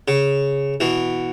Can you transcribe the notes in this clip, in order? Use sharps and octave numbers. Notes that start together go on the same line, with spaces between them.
C#3
B2 E3